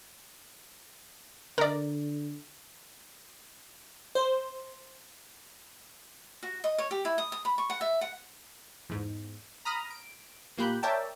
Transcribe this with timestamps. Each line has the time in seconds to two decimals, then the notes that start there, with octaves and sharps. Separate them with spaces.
1.58 D3 A#4 D5
4.15 C5
6.43 F#4
6.64 D#5
6.78 C#5
6.91 G4
7.05 E4
7.18 D#6
7.32 D#6
7.45 B5
7.58 C#6
7.70 F#5
7.81 E5
8.01 F#5
8.89 E2 G#2
9.65 A#5 B5 D#6 F6 A#6
9.91 D7
10.58 A#2 A#3 G4 B5 F#6 G6
10.83 A#4 C#5 D5 E5 G5 A5